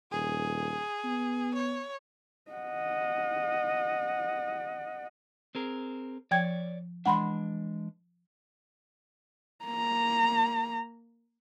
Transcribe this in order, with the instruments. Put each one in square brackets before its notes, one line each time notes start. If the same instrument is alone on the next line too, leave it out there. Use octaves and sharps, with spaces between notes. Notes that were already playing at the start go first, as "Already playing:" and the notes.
[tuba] D#1 [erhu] G#4
[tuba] B3
[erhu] C#5
[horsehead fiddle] D#5 F#5
[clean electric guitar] C4 G#4 A#4
[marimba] F3 G5 G#6 [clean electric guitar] C#5 D5
[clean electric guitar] E3 G#3 D4 [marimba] F#5 B5 C6
[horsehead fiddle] A#3 A#5